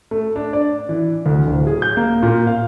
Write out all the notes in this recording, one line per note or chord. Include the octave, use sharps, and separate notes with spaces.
A3
D4
D5
E3
D2
D1
G#4
G6
A#3
A#2
F5